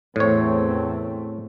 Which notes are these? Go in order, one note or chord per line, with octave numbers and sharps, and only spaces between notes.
E2 A2 A3 C4 C#5